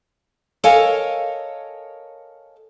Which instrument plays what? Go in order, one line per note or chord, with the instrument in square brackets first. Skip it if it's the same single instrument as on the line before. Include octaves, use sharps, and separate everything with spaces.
[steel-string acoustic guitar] A4 A#4 C#5 D#5 F5 G#5